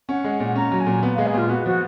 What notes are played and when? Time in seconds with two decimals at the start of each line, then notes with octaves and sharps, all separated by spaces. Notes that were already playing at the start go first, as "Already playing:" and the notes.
0.09 C#4 F#5
0.24 G#3
0.40 A#2
0.55 C#4 A#5
0.72 F#3
0.80 G#5
0.86 A#2
1.03 B3
1.14 G#3 F5
1.26 G#4
1.34 A#2 F4
1.49 B3 F#4
1.66 F3 F#4